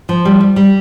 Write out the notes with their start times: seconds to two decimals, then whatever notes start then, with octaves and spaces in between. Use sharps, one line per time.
0.09 F3
0.25 G3
0.41 G3
0.56 G3